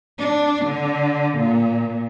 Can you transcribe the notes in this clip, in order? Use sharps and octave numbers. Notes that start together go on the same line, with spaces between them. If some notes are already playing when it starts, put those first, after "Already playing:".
D4
D3
A#2